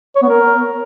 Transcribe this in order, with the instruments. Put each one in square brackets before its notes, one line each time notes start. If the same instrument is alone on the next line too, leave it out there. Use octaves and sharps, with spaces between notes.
[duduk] C#5
B3
A#4